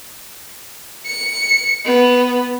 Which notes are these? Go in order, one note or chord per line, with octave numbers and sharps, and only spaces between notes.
C#7
B3